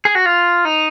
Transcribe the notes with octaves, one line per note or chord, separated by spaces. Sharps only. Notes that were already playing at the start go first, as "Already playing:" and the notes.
G#4
F#4
F4
D#4